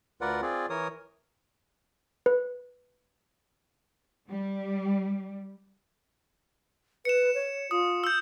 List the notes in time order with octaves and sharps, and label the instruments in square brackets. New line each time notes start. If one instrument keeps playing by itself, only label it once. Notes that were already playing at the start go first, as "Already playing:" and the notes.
[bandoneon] D2 F4 A#4 B4 D5 F#5
C4 F4 G#4 D5
E3 A#4 C#5 D#6
[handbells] B4
[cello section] G3
[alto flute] B4 [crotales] C#7 E7
[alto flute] C#5
[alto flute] F4 [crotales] D#6
[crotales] E6 G6